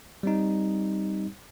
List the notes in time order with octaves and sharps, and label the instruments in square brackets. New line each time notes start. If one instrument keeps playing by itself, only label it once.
[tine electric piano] G3 C4 D#4